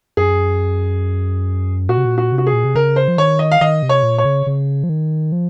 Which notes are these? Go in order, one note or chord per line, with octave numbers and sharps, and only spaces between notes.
F#2 G#4
A#2 F#4
C3
A#2
F#4
C3
F#4
G#4
A#2
C3
C#3 A#4
C5
F3
D#3 C#5
D#5
F5
D#3 D#5
C3
C#5
A#2
C#5
C#3
C#3
F3
D#3
F3